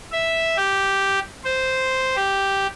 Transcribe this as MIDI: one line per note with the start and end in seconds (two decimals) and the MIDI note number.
0.12 0.57 76
0.57 1.20 67
1.44 2.16 72
2.16 2.67 67